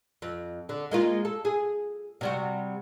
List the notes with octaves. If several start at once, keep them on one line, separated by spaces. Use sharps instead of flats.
F2
D3
G#3 A#3 F4
A4
G#4
C3 G3 F#4